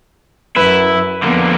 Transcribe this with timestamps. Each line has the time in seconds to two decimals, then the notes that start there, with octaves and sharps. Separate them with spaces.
0.56 F#2 E4 B4
1.23 F2 D3 A#3 B3